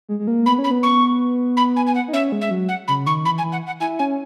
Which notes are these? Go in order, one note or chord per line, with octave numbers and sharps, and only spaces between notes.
G#3
G#3
A#3
B3 B5
C#4
B5
B3
C#6
B5
G#5
G#5
F#5
D#4
C#4 E5
G#3
E5
F#3
F#5
C#3 B5
D#3 C#6
E3 B5
G#5
E3
F#5
F#5
E4 G#5
C#4 G#5